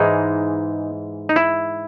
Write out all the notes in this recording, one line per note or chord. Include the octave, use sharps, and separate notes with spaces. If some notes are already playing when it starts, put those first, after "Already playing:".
Already playing: G#2 E3 G#3 D#4
D#4
E4